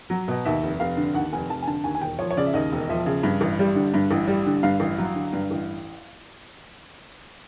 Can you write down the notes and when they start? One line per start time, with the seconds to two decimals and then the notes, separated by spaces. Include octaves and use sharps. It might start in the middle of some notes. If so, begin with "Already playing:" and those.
0.10 F#3
0.28 B2
0.45 D#2 E5
0.63 F1
0.80 F1 F5
0.97 D3
1.14 D#2 F#5
1.33 F1 G#5
1.49 F1 A5
1.62 G#5
1.67 D3 A5
1.84 D#2 G#5
1.95 G#5
2.01 E1 G5
2.19 F3 C#5
2.31 C#5
2.37 C#3 D5
2.46 E5
2.54 D#2 D#5
2.72 E1
2.89 F3 E5
3.06 C#3
3.23 G2
3.41 A1
3.59 G3
3.75 D3
3.94 G2
4.11 A1
4.28 G3
4.46 D3
4.63 G2 F5
4.80 A1
4.98 F#3
5.15 D3
5.33 G2
5.51 A1